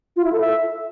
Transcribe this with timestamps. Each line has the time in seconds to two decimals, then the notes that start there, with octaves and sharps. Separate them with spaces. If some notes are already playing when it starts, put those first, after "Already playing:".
0.16 F4
0.24 E4
0.32 A4
0.40 E5